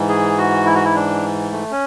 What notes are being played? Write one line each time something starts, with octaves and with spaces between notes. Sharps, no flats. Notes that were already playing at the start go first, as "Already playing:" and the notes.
Already playing: G#2 E3
G#4
F#4
E4
F#4
E4
D4
A3
C#4